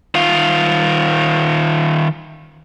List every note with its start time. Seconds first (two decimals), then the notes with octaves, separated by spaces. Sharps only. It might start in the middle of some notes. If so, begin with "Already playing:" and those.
0.15 D#3 F4